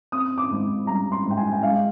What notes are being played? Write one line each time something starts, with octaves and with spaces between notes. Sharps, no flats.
C4 D#6
D6
G#2
G3 A#5
C6
G#2
G5
G#5
G5
G#3 F5